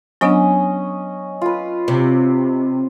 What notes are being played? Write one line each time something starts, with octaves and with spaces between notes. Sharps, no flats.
F#3 B3 C#4 D4 D#5
F4 B4
C3